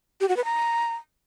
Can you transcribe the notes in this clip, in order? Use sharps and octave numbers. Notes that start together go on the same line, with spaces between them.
G4
F#4
B4
A#5